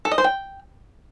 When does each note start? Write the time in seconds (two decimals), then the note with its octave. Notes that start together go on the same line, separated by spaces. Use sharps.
0.05 A4
0.12 D#5
0.18 C5
0.24 G5